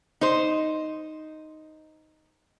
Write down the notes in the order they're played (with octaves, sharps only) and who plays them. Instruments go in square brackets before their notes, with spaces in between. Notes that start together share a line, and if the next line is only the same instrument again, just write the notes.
[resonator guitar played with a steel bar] D#4 C5